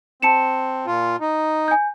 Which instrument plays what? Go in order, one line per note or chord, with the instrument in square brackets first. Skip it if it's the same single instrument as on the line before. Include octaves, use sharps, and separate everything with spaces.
[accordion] C4 [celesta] A5 C#7 E7
[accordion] A#2 F4
D#4
[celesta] G#5 G6